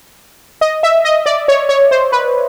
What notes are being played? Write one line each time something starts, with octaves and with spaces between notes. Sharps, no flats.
D#5
E5
D#5
D5
C#5
C#5
C5
B4